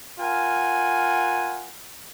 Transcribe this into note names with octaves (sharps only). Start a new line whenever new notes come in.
F4 A#4 F#5 G#5